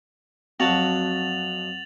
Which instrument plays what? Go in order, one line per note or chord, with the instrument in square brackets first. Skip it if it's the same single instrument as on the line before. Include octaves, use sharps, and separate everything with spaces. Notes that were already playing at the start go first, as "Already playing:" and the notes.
[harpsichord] F2 F#3 [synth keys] C4 [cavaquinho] F#4 A5 [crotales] A6 F7 F#7